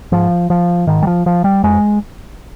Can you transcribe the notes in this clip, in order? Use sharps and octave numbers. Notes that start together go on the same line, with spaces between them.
G#2 F3
F3
G#2 D#3
G3
F3
F3
G3
F2 G#3